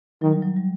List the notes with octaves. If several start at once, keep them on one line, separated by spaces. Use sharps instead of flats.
D#3 F#3
G3
F#3
G3